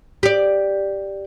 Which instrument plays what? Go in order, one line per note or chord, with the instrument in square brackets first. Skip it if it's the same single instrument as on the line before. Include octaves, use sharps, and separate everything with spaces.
[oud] G4 D5